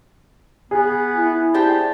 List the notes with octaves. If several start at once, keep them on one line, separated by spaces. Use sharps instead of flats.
B3 G#4
E4
D4 G4 C5 A5